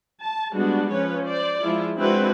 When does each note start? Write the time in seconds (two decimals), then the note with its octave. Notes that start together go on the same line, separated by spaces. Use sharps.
0.20 A5
0.53 G3 G#3 B3 D4 F#4
0.91 F3 C#4 B4 C#5
1.24 C5 D5
1.62 F3 G#3 E4 F4
1.96 G#3 C4 D4 E4 F#4 B4